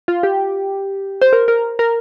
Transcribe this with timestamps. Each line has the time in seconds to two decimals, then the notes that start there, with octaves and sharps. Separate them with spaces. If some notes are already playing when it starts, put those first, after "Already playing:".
0.08 F4
0.23 G4
1.22 C5
1.33 A#4
1.48 A#4
1.79 A#4